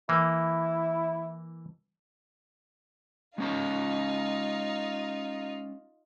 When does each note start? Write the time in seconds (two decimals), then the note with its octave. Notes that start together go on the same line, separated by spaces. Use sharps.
0.09 E3 A#3 E4
3.38 G#3 C#4 D#4 F4 A#5